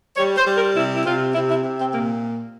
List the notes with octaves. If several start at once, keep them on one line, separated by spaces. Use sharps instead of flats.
G3 C#5
C5
G3
A#4
C3 E4
E4
C3 F4
C3 E4
E4
C3
C4
A#2 A#3